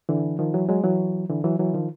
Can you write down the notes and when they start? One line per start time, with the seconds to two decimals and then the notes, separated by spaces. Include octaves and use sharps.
0.09 D3 E3
0.39 D#3 F3
0.54 E3 F#3
0.69 F#3 G#3
0.84 E3 F#3
1.30 D3 E3
1.44 E3 F#3
1.59 E3 F#3
1.74 D#3 F3